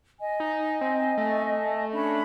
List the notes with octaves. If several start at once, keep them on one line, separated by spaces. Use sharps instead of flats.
D#5 G#5
D#4
C4
A3
C#4 D4 B5